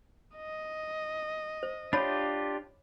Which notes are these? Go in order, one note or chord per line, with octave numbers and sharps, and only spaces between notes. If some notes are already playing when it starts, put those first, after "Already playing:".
D#5
C5
D4 F4 G4 C#5 B5